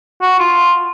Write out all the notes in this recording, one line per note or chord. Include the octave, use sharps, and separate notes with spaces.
F#4
F4